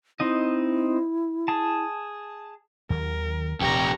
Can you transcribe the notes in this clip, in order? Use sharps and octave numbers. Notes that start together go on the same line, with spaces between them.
C4 D#4 E4 D#5
G#4 A5
D#2 D#3 F#3 A#4
D#1 F2 C3 G4 A#5 C#6